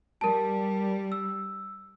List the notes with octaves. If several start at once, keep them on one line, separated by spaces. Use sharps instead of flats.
G3 A#4 A5
E6